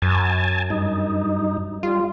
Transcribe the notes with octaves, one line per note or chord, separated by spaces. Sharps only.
F#2 G#5 A5
G2 D#4
G3 F4